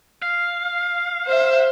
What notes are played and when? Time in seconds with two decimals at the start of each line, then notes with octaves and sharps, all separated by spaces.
0.22 F5
1.27 C5 E5